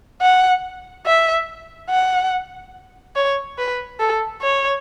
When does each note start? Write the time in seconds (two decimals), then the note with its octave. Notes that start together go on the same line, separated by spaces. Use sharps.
0.22 F#5
1.06 E5
1.90 F#5
3.16 C#5
3.59 B4
4.00 A4
4.42 C#5